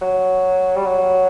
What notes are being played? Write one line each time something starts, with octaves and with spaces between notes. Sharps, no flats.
F#3
G3
F#3